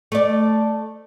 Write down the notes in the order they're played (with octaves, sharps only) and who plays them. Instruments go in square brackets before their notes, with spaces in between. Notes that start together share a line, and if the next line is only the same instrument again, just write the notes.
[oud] A3 D5